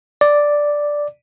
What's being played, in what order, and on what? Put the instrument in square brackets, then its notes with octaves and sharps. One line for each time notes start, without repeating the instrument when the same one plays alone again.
[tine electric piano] D5